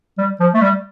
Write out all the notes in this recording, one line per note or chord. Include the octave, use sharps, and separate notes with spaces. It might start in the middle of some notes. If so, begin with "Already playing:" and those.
G3
F3
A3
G3